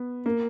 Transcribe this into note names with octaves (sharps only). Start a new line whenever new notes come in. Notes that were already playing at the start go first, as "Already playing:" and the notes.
Already playing: B3
A#3